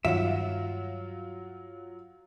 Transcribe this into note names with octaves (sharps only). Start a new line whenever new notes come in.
G2 D#3 F#3 F4 E5 F#5